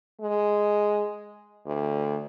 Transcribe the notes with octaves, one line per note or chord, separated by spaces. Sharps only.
G#3
D2